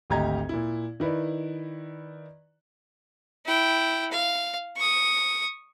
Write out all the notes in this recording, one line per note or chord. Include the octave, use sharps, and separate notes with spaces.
G#1 D2 G4 D#5 A#5 G#6
A#2 E4
D#3 E4 B4 D5
E4 G5
F5
C#6 D#6